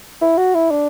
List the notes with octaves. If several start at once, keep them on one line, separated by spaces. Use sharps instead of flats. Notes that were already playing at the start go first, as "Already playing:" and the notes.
E4
F#4
E4
D4